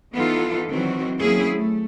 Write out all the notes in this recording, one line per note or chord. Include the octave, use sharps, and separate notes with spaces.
E3 B3 D#4 F4 A4
D#3 E3 F#3 C4 F#4
F#3 A#3 C4 C#4 E4 G#4
A3